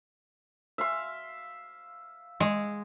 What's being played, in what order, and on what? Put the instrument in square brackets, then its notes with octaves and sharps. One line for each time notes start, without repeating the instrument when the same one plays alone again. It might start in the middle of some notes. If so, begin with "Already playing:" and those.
[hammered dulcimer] E5 F5 C6
[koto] G#3